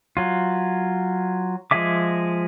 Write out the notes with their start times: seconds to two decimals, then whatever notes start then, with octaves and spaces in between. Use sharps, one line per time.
0.17 F#3 F4
1.71 F3 G#3 G#4 E5 D6